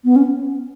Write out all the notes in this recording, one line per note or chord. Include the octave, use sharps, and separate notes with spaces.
B3
C#4